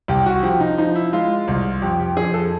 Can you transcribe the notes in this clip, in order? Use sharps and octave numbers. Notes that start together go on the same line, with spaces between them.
C2 G4
F#4
F3 G4
D#4
F3 D#4
E4
G#3 F4
C2
F2 G4
G4
F2 G#4
A4